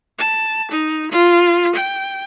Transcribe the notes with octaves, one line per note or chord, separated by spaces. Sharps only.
A5
D#4
F4
G5